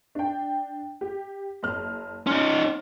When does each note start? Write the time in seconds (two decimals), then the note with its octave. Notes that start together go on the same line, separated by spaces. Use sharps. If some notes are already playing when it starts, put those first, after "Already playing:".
0.15 D4 G5
1.01 G4
1.63 F#1 F6
2.27 C#4 D#4 C6 F6